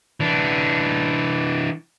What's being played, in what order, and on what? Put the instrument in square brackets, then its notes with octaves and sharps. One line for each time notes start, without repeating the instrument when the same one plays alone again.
[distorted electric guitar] E3 D4